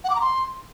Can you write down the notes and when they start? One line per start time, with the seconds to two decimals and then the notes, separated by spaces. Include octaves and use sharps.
0.04 F#5
0.10 D6
0.15 A#5
0.21 C6